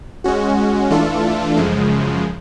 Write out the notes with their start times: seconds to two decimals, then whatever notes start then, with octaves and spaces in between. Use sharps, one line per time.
0.24 G#3 C#4 F#4
0.90 E3 A3 D4 F4 A4
1.57 F#2 C#3 F3 G#3